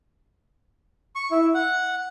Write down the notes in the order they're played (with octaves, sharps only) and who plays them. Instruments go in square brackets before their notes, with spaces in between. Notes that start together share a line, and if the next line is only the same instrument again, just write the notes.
[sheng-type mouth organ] C#6
E4
F#5